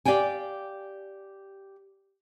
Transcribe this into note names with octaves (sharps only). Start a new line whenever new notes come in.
G4 D5 F5 G5 G#5